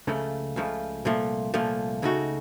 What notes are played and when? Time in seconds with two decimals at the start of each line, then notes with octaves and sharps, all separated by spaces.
0.07 C#2 C#3 F3 A3
0.56 C#2 C#3 F3 A3
1.05 C2 A#2 F3 A3
1.54 C2 A#2 F3 A3
2.02 C#2 C#3 A3 D#4 F#4